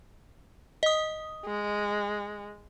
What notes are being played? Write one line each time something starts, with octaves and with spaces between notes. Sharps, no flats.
D#5 D#6
G#3